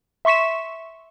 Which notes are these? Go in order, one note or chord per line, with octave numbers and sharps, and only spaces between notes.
E5 C6 C#6 B6 E7